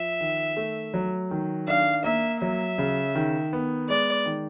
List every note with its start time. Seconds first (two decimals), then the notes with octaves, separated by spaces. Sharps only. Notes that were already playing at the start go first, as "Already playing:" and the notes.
Already playing: F3 E5
0.21 D#3
0.57 A3
0.94 F#3
1.31 D#3
1.68 D4 F5
2.04 A#3 E5
2.41 F#3 E5
2.78 C#3
3.15 D#3
3.53 B3
3.89 G#3 D5
4.26 D#3